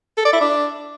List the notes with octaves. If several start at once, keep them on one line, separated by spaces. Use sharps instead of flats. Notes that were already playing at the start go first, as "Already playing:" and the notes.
A4
D5
E4
D4